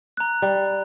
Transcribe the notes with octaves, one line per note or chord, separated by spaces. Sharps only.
A#5 F#6
G3